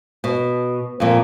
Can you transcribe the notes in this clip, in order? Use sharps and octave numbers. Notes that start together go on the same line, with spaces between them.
B2
F2 A#2